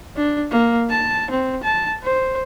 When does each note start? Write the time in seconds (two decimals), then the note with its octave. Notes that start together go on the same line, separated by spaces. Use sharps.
0.17 D4
0.51 A#3
0.90 A5
1.31 C4
1.64 A5
2.03 C5